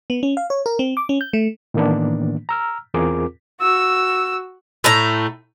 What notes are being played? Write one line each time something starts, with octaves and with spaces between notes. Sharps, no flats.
B3
C#4
F5
C#5
A#4
C4
D6
C#4
G6
A3
A2 D#3 E3 A#3 B3 D4
A#5 E6 F6
E2 C4 F4 G#4 A#4 D6
F#4 E6
A2 A3 A#5